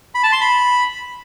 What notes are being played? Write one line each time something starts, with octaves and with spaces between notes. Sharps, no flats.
B5
A5
C6
B5